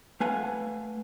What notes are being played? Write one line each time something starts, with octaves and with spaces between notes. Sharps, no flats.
A3 B4 F5 F#5 G#5